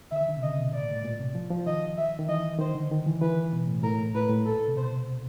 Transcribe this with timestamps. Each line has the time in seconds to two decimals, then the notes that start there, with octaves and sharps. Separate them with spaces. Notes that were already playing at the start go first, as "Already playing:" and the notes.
0.11 D3 E5
0.21 D#3
0.28 D3
0.37 C3
0.42 C#3 D#5
0.58 B2
0.73 A2 D5
0.83 A#2
0.91 A2
1.04 A#2
1.20 C3
1.35 F3
1.50 F3
1.66 D#3 D#5
1.97 E5
2.19 D#3
2.28 E3 D#5
2.59 D#3 C5
2.75 D3
2.91 D#3
3.07 E3
3.21 E3 B4
3.53 B2
3.67 A2
3.83 A2 A#4
3.99 A#2
4.15 A2 B4
4.29 A2
4.45 A#2 A4
4.68 C3
4.76 B2 C5